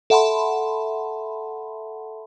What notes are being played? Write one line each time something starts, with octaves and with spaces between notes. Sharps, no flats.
A4 E5 F#5 A5 B5 C6